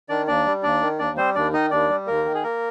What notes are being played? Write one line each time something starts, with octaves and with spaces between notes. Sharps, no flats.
D#3 D4 D5
D#2 D4 D5
G3
D#2 D4 D5
D#3
D#2 D4 D5
G3 C4 C5
D#2 D4 D5
D#3 D#4 D#5
D#2 D4 D5
G3
D#2 A#3 A#4
D#3
G#4
A#3 A#4